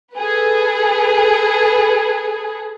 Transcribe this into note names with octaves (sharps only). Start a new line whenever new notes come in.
G#4 A4 B4